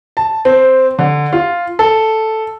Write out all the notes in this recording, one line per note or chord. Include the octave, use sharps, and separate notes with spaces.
A5
C4
D3
F4
A4